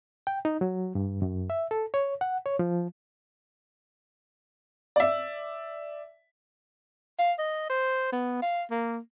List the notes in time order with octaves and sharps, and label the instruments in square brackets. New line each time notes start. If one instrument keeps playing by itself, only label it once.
[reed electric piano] G5
D#4
F#3
G2
F#2
E5
A4
C#5
F#5
C#5
F3
[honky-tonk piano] D5 E5
[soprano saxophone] F5
D#5
C5
B3
F5
A#3